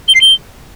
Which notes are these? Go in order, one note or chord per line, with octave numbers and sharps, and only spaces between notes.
G7
C7
G7